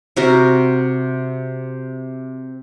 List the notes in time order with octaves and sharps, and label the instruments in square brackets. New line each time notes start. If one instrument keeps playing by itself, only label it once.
[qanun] C3 F#4 A#4